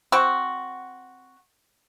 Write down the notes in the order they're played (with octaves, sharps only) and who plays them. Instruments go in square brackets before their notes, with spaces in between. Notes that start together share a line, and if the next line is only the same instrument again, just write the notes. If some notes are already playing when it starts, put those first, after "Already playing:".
[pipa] C4 F#4